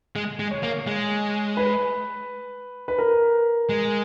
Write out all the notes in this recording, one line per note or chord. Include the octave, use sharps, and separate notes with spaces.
G#3
G#3
C#5
A#3
G#3
B4
B4
A#4
G#3